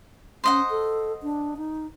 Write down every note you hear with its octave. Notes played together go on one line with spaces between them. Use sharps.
C#4 C5 D#5 F#5
A4
D4
D#4